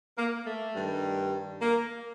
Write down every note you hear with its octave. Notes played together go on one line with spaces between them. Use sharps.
A#3
A3
G2 D#3 G3
A#3